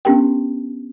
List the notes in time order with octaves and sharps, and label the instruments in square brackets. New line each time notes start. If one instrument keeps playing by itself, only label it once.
[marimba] B3 C#4 D4 G4 A#4 G5